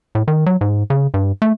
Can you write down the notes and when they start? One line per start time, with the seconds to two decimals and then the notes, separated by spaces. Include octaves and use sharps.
0.15 A2
0.28 D#3
0.46 F#3
0.61 G#2
0.90 C#3
1.14 G2
1.42 A3